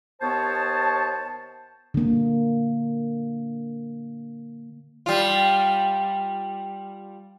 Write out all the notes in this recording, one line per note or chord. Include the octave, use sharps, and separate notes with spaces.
D#2 B3 C5 C#5 A5
D3 A#3
G3 F4